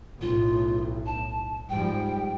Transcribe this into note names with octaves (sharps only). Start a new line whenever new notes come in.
B1 A2 F4
A5
G#2 F3 G3 G5